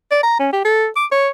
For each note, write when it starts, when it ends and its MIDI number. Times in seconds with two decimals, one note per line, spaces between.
0.11 0.20 74
0.23 0.38 82
0.39 0.49 61
0.53 0.60 67
0.65 0.87 69
0.96 1.06 86
1.12 1.29 73